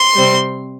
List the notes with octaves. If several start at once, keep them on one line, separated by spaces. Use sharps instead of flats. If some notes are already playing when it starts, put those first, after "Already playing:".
Already playing: C6
C3 G3 C4